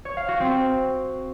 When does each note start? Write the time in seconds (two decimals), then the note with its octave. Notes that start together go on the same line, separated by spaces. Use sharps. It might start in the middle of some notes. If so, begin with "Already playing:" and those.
0.05 C#5
0.17 F5
0.28 F#4
0.40 C4